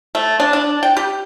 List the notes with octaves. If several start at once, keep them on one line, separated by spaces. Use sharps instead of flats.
A3
D4
D4
G5
G4